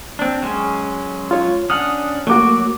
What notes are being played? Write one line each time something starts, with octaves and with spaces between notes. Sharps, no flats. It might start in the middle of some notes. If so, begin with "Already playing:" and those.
C4 D4
F#3 G#3 C#4
F4 C#5
C#4 D4 F#5 D#6 F6
F#3 A3 A#3 F#4 D6